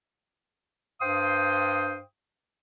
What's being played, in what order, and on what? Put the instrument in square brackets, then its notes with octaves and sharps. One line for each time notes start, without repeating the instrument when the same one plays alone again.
[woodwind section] G2 C5 F5 G5 C6 D#6